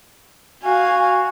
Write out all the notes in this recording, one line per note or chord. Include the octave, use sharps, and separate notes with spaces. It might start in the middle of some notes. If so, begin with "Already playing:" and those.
F#4 F5 G#5